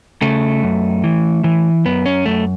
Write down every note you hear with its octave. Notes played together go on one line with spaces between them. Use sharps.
C#3 A3
F#2
E3
E3
F#2 B3
C#4
F#2 A3